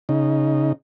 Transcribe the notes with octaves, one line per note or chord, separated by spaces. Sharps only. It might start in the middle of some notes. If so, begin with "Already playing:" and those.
C#3 D#4